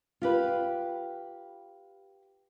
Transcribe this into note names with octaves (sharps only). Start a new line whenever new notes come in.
F4 G4 B4